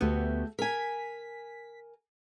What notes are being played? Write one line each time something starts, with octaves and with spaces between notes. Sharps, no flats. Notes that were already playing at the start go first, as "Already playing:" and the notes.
D2 A3 B3 F#4 G4
A#4 G#5 B6